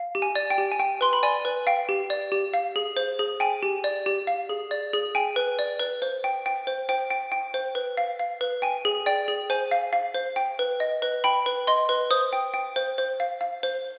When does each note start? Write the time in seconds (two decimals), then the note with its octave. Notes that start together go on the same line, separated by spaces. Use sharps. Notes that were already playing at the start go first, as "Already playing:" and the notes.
Already playing: F5
0.15 G4
0.22 G#5
0.36 D5
0.50 G5
0.58 G4
0.71 G#5
0.80 G5
1.01 B4 C6
1.13 B5
1.23 D5 G#5
1.45 B4
1.67 F5 G5
1.89 G4
2.10 D5
2.32 G4
2.54 F5
2.76 G#4
2.97 C5
3.19 G#4
3.40 G5 G#5
3.63 G4
3.84 D5
4.06 G4
4.27 F5
4.49 G#4
4.71 D5
4.94 G#4
5.15 G5 G#5
5.36 B4
5.59 D5
5.80 B4
6.02 C5
6.24 G5
6.46 G5
6.67 C5
6.89 C5 G5
7.10 G5
7.32 G5
7.54 C5
7.75 B4
7.97 F5
8.19 F5
8.41 B4
8.62 G5 G#5
8.85 G#4
9.06 D5 G5
9.28 G#4
9.50 C5 G#5
9.71 F5
9.93 F5
10.14 C5
10.36 G5
10.59 B4
10.80 D#5
11.02 B4
11.24 G5 B5
11.46 B4
11.67 D#5 C6
11.89 B4
12.11 C5 D#6
12.33 G5
12.54 G5
12.76 C5
12.98 C5
13.20 F5
13.41 F5
13.63 C5